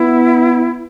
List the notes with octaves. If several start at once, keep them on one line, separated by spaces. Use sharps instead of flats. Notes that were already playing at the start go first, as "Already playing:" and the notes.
Already playing: B3 E4